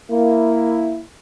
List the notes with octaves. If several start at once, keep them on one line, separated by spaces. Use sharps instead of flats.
A#3 E4